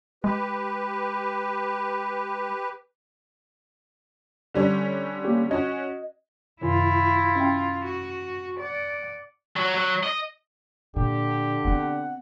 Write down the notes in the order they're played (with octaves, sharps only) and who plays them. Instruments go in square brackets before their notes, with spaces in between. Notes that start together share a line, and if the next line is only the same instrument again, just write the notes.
[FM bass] G#3 [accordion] G4 B4
[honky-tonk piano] D3 G3 C#4
[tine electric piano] A#3 G4
[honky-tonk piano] C#4 F#4 [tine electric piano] D#5
[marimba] F#2 C3 D#3 [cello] E4 F4
[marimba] C#4 E5 G5
[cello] F#4
D5 F#5
[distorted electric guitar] F#3
F#3
D#5
[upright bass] A#2 [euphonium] D3 [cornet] G4
[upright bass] B3 C4 [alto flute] F#5